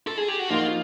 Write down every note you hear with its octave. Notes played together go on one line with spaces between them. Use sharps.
A4
G#4
G4
F#4
F3 A#3 D#4 F4